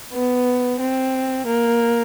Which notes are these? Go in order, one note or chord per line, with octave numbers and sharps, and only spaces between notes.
B3
C4
A#3